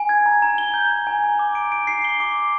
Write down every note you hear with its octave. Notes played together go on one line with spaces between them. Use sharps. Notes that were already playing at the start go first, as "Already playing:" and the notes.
Already playing: G#5
G#6
A#5
A#5
G7
G6
G#6
G#5
A#5
D6
D7
D7
C7
G7
D6
D6